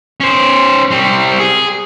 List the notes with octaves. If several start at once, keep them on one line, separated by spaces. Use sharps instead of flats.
C#4 C5
G3 C4
G#4